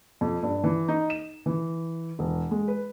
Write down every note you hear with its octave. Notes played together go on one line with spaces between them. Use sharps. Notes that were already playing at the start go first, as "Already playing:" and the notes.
F2
G2
E3
D#4
E7
E3
E1
G#3
B4